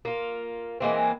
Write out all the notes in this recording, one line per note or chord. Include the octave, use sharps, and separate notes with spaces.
A#3 F4
E3 G#3 A#3 C4